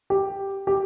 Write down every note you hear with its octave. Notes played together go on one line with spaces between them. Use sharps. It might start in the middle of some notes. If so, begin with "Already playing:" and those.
G4
G4